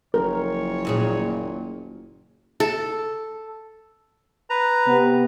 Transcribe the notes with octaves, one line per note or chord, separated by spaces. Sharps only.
F#1 F3 F4 A#4 C#5
D#2 A#2 G#4
A4
B4 A#5
C3 B3